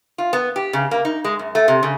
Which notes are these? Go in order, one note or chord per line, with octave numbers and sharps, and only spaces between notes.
F4
B3
G4
C#3
A#3
D#4
G#3
F#2
A3
C3
C#3